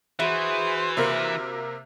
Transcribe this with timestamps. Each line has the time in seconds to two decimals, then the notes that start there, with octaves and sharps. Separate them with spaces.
0.19 E3 E4 F#4 G#4 C5
0.97 C3 A#3 A#4